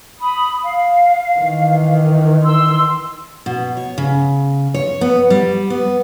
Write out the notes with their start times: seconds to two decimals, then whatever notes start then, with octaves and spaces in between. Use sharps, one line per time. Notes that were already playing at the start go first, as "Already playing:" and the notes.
0.19 B5 D#6
0.63 F5
1.39 D#3 E3
2.43 C6 E6
3.46 B2
3.77 C#5
3.98 C#3
4.74 C#5
5.01 B3
5.30 G3
5.70 B3